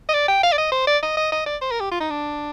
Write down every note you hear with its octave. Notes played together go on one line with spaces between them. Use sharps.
D#5
D5
G5
F5
D5
D#5
C5
D5
D#5
D#5
D#5
D5
C5
A#4
G4
F4
D#4
D4